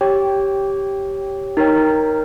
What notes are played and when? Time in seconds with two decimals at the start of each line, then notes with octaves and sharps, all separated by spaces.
0.01 G4 C#5 G5
1.57 D#4 A#4 C#5 G5